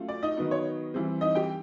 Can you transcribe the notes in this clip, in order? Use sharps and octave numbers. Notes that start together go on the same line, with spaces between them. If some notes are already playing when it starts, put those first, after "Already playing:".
Already playing: F#3 A3 C#4 F4
D5
D#4 D#5
D#3 F#3 B3 D#4
C#5
E3 G3 C4
D#4 D#5
G4 G5